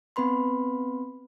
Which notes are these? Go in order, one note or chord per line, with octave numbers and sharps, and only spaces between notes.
B3 C4 B4 B5 C6